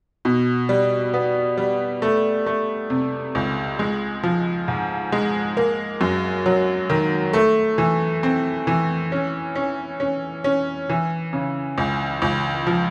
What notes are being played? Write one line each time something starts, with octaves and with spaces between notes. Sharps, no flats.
B2
G3
B3
G3
A3
A3
C3
C#2
G#3
F3
G#2
G#3
A#3
F#2
F#3
D#3
A3
E3
C4
E3
C#4
C#4
C#4
C#4
E3
C#3
C#2
C#2
F3